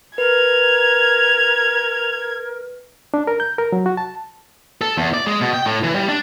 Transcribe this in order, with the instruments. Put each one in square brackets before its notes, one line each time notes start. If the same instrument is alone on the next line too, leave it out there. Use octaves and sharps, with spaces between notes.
[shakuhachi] A#4 [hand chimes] B4 [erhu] G#6 [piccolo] F7
[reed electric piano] D4
A#4
G6
A#4
F#3
F#4
A5
[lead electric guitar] A4
E2
D5
G#3
B2
G5
A2
E3
G3
D4